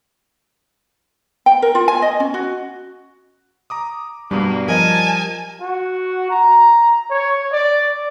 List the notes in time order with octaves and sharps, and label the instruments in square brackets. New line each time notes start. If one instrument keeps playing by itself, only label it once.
[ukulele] G5
A#4
F4
G#5
D#5
C#4
F#4
[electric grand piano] A#5 D6 D#6
[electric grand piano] G2 B2 B3 [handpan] G3 [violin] A#3
[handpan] F3 [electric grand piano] A#4 D#5 [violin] G#5 A5
[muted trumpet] F#4
A#5
C#5
D5